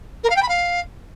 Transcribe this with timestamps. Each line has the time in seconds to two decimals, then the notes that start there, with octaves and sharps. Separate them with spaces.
0.23 A#4
0.29 F5
0.36 G5
0.42 B5
0.48 F5